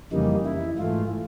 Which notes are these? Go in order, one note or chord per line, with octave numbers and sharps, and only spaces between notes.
F2 C#3 E3 G3 A#3 D#4
E4
G#2 E3 A3 F4